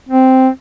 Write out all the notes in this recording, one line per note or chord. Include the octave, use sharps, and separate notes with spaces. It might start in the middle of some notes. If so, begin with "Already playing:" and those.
C4